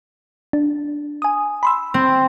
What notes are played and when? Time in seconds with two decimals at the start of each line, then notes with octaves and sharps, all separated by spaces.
0.53 D4
1.22 G#5 D#6
1.63 B5 C6 E6
1.94 C4